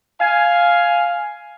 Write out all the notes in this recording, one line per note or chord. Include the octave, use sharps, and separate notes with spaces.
F5 G#5